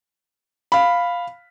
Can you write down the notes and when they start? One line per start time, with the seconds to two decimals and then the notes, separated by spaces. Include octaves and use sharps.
0.72 F5 B5